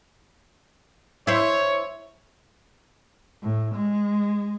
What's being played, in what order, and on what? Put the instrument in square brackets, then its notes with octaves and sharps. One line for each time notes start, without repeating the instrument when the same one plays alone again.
[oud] E4 C5 [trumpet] C#5
[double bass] A2
G#3